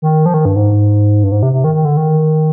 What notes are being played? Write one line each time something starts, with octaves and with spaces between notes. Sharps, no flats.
D#3
F3
D#3
G2
G#2
G2
G#2
C3
C3
D#3
D#3
D3
D#3